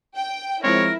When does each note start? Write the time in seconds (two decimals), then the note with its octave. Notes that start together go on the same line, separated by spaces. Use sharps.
0.15 G5
0.64 F3 G#3 C4 E4 A#4 C#5